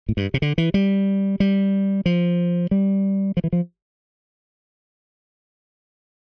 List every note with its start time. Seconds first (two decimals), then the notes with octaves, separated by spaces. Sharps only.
0.09 A2
0.17 G2
0.34 C3
0.42 D3
0.58 E3
0.74 G3
1.40 G3
2.06 F3
2.71 G3
3.37 F3
3.44 E3
3.53 F3